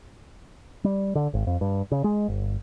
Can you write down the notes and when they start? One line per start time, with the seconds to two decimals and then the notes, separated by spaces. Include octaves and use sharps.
0.84 G3
1.15 D3
1.34 G#1
1.47 F2
1.61 G2
1.92 C#3
2.04 G#3
2.28 G1